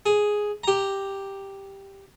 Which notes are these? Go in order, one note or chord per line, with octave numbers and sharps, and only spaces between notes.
G#4
G4 A#5